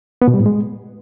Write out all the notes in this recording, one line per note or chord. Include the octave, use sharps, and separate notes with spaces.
B3
B2
G3
A2
G#3